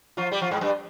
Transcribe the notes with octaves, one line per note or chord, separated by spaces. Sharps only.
F3 F4
G3 G4
F3 F4
G#2 G#3
G2 G3